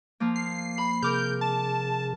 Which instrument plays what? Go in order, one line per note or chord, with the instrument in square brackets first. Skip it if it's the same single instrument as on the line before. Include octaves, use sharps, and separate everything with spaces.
[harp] F3 A#3
[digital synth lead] C7
[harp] B5
[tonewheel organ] C3 G#4 [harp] A#4 D6 F6 [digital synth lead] G6
[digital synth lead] A5